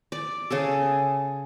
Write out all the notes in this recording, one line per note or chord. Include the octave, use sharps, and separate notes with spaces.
D5
C#3 G#4 A4